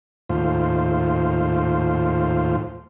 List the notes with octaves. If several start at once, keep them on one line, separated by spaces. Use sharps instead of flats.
D#2 A2 F4 C5